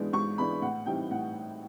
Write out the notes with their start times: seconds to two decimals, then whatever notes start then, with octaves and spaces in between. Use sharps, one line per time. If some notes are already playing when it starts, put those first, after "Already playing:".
Already playing: G#2 E3 G#3 B3 D4
0.13 G#2 C#6
0.38 E3 G#3 B3 D4 B5
0.61 A2 F#5
0.86 E3 G3 C4 D#4 G5
1.11 A2 F#5